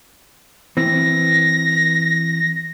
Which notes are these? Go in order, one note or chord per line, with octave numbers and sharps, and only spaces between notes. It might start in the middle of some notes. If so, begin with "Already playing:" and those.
E3 C4 A#6